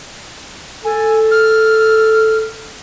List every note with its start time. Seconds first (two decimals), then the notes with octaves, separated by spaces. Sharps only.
0.85 A4 G#5
1.31 F6